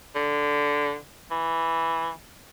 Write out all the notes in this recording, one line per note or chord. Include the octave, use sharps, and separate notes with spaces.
D3
E3